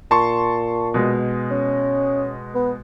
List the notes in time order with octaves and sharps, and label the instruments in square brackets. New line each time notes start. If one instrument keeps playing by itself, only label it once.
[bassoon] A#2 [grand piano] A5 C6 C#6
[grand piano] B2 G#3
[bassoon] C#4
B3